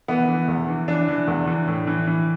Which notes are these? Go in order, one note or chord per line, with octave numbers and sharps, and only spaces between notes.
E3 B3
E3
E2
E3
E3 D4
E3
E2
E3
A2
E3
E3